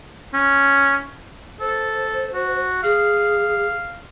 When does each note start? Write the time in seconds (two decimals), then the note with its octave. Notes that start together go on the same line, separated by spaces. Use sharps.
0.34 C#4
1.60 A4 C5
2.34 F#4
2.83 G#4 F5